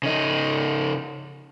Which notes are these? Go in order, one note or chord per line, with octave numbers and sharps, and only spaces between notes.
C#3 D#4